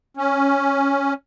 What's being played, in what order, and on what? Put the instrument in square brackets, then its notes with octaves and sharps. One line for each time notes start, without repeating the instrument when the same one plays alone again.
[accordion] C#4